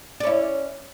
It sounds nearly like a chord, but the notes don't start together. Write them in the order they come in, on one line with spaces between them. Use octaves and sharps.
D5 C#4 E4